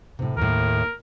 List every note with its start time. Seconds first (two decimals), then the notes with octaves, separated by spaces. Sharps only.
0.19 A2 C3
0.37 D#2 A2 A#4